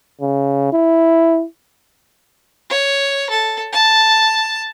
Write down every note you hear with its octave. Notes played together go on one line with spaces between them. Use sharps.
C#3
E4
C#5
A4
A5